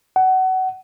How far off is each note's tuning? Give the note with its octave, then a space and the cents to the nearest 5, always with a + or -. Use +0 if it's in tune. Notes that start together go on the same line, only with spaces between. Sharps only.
F#5 +25